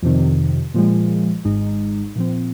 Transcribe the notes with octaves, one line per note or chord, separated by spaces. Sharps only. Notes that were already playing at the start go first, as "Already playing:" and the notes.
F2 C3 D#3
A#2 F3 G#3
G#1 G#2 G#3 D#4
A#2 F3 C4